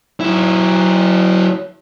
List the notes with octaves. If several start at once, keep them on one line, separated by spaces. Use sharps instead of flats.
F#3 E4